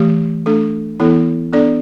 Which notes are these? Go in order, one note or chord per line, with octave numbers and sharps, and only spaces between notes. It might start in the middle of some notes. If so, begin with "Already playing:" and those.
Already playing: E3 A3 G4
A3 D4 A4
E3 B3 E4 A4
B3 D4 A4 D5